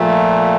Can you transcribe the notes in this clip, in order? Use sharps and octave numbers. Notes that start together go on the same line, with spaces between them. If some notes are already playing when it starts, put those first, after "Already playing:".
Already playing: A#2 F3 A3